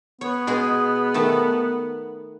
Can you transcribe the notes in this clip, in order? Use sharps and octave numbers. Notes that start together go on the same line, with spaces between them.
B3 C#5
B2 G#3 G#4
D#3 A3 A5